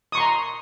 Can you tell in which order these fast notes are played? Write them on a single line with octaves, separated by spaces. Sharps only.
D#6 C#6 C6 A#5